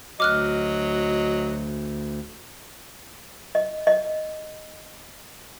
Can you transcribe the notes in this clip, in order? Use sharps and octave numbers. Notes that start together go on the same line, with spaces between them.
D2 F#3 D#5 D6 F6 F#6
D#5
D#5